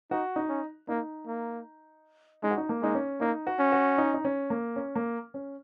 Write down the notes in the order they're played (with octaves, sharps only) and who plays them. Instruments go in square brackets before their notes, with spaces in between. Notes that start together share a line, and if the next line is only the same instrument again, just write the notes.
[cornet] D#4 [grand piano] F#4
[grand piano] D#4
[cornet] C#4
[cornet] A#3 [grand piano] D#4
[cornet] A#3
[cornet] G#3 [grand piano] D#4
[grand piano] F#4
D#4
A#3
[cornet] G#3 [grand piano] D#4
[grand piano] C#4
[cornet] A#3 [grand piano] D#4
[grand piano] F#4
[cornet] C#4
[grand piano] F#4
D#4
D#4
C#4
A#3
C#4
A#3
C#4